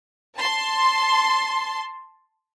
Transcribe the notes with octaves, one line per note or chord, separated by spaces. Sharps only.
A5 C6